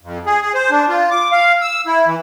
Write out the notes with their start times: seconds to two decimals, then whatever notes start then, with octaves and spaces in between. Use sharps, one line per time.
0.01 F2
0.26 G#4
0.42 G#4
0.55 C5
0.71 D4
0.88 F4
1.11 D6
1.32 F5
1.61 E6
1.87 E4
2.06 E3